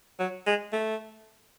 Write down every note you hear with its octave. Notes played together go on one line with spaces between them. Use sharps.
F#3
G#3
A3